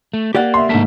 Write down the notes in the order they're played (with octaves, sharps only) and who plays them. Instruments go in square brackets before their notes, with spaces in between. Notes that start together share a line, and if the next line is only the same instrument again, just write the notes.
[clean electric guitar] A3
[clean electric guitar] A#3 [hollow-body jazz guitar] G4 D5 F#5
[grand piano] E5 C6
[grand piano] G#2 A3 B6 [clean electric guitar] D#3 A#3 A5